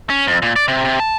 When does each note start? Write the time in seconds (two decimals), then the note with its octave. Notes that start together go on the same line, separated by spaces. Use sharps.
0.10 C#4
0.27 F2
0.42 A#2
0.56 D5
0.68 C3
0.85 C3
1.00 A5